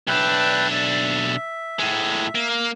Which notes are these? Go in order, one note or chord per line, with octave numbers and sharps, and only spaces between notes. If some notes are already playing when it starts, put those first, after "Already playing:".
B1 D4 B4 E5 G5
E5
A2 G#3
A#3